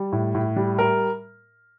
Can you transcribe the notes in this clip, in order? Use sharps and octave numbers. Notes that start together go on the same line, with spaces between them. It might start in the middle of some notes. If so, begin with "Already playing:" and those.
Already playing: G3
A2
A2
G3
A#4